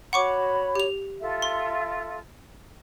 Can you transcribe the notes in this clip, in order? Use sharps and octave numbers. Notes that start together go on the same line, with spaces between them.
F#4 C#5 F#5 B5 C#6 D6
G4 F7
F4 A4 E5
C6